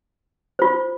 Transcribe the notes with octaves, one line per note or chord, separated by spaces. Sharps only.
F4 C5